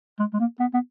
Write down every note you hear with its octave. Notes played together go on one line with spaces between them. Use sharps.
G#3
G#3
A#3
B3
B3